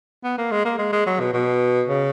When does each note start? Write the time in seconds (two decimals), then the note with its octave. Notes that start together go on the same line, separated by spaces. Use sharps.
0.24 B3
0.38 A#3
0.51 G#3
0.65 A#3
0.79 G#3
0.93 G#3
1.06 F#3
1.20 B2
1.33 B2
1.88 C#3